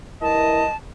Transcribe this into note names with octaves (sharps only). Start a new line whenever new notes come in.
G2 E4 A#4 D#5 A5